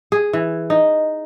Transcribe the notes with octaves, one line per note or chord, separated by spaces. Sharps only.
G#4
E3
D#4